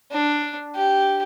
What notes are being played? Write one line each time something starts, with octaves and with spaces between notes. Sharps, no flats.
D4
G4